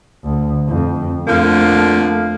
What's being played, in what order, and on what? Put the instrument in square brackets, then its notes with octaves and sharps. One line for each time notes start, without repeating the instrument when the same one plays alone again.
[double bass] D2
F2
[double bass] F2 A3 [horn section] D3 F3 A#3